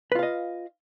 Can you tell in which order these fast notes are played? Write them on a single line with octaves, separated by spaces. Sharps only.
B4 F4 F5 D#5